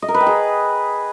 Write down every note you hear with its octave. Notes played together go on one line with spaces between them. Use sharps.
D#5
A#4
B4
G5
G#4